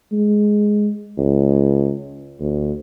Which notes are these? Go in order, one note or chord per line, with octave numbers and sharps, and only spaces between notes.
G#3
C#2
D2